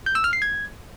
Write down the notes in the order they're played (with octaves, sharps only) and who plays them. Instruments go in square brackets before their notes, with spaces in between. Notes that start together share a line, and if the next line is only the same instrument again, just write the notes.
[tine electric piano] G6
E6
F6
C7
G#6